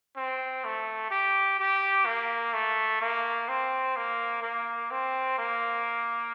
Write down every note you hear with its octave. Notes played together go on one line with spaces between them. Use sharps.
C4
A3
G4
G4
A#3
A3
A#3
C4
A#3
A#3
C4
A#3